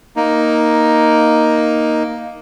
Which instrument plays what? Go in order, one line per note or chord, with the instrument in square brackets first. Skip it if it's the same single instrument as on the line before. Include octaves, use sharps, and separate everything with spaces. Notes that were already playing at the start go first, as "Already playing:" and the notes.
[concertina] A#3 D#4